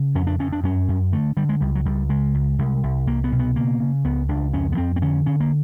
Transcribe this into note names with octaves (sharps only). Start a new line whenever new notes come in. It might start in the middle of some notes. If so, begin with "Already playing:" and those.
Already playing: C#3
F2 C#4
D4
F2 C#4
D4
F#2 C#4
F#2
D3 A3
D3 G3
G#3
C#2 G3
F#3
C#2 G3
C#3 G#3
C#2
C2
C2
C2 A#3
B3
B2
B3
C#3 A#3
C#3
C#2 B3
C#2 D4
F2 C#4
B3
F2 C4
C4
D3 C#4
D3 C#4
A#3